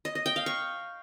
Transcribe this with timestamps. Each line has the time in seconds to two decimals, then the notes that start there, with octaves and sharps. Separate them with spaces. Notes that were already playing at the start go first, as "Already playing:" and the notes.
0.05 D#5
0.15 D#5
0.26 G5
0.36 F5
0.46 C#6